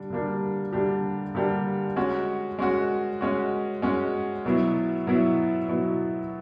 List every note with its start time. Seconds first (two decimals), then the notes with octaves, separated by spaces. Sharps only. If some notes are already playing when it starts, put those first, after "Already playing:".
Already playing: D3 G3 D4
0.10 D3 G3 A#3 D4 G4
0.73 D3 G3 A#3 D4 G4
1.35 D3 G3 A#3 D4 G4
1.96 G#3 C#4 F#4
2.59 G#3 C#4 F#4
3.21 G#3 C#4 F#4
3.82 G#3 C#4 F#4
4.45 B2 F#3 B3 E4
5.07 B2 F#3 B3 E4
5.68 B2 F#3 B3 E4